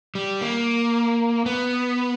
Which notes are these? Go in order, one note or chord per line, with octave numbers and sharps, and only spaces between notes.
G3
A#3
B3